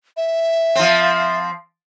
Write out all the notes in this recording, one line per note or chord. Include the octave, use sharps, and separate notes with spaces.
E5
F3 C4